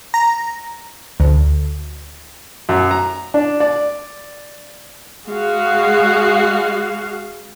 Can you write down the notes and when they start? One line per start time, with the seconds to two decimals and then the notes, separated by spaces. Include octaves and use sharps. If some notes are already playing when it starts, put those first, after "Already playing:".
0.14 A#5
1.20 D2
2.69 F#2
2.91 A#5
3.34 D4
3.60 D5
5.27 G#3 F#4 F5